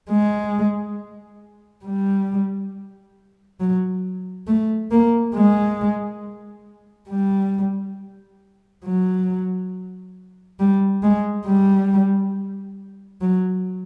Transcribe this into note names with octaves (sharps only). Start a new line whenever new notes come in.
G#3
G3
F#3
A3
A#3
G#3
G3
F#3
G3
G#3
G3
F#3